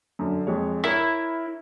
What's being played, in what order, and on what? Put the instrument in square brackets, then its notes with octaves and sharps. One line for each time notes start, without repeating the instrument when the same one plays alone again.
[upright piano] F#2 D3
F2 G#3 C#5
[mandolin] E4 [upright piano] A#4 C#5